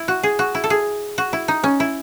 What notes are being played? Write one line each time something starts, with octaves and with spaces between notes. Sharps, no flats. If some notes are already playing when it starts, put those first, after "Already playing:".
Already playing: E4
F#4
G#4
F#4
E4
A4
G#4
F#4
E4
D#4
C#4
E4